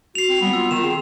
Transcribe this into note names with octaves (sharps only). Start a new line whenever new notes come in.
F#4 C7 F7
C4
G3 B3
F4 E6
D#3 E7
C4 G#4